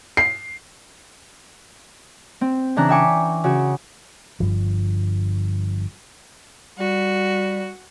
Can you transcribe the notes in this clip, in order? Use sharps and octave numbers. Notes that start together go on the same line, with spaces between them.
C7
C4
C#3 E3 D4 A#5 F#6
E5 G5 G#5 C#6 D6
C#3 F#4
G1 G2 F3
G3 F#4